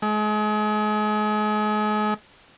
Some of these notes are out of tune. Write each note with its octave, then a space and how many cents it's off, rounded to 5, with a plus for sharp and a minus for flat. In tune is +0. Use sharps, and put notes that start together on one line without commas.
G#3 +35